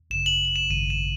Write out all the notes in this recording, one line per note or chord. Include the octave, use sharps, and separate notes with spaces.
G#1 F#2 C#3 E7
F#7
F#7
E7
G#1 F#2 C#3 D#7
E7